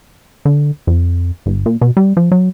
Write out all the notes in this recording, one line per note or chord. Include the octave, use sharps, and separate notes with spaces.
D3
F2
G1
A#2
B2
G3
F3
F#3